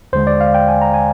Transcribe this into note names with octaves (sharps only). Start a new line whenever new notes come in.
D#2 D3 G#3 C5
D5
F5
G5
G#5
A#5
G#5